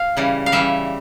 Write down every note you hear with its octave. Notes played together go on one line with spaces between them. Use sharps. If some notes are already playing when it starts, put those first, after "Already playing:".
Already playing: F5
C#3 E3 G3
F5
C#3 E3 G3 E5